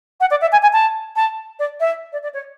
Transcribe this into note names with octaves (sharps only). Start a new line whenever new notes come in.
F#5
D5
E5
G#5
G#5
A5
A5
D5
E5
D5
D5
C#5